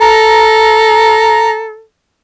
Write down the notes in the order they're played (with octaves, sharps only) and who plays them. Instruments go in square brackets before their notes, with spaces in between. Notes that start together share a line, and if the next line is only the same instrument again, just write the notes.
[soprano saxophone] A4 [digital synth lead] A#5